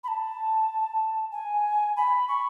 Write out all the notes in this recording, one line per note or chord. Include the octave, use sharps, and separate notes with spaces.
B5
A5
G#5
B5
C#6